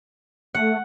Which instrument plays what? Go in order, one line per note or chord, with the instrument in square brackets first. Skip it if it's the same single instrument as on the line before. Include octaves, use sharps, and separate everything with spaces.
[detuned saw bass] A3 [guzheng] F#5